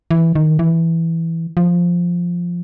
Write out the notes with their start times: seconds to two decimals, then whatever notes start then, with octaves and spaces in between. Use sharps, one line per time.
0.11 E3
0.35 D#3
0.59 E3
1.57 F3